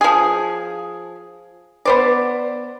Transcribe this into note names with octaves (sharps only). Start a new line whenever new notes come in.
F3 G#4
B3 C5 D5